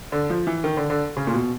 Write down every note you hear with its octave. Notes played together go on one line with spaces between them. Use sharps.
D3
F3
E3
D#3
D3
D3
C#3
A#2
B2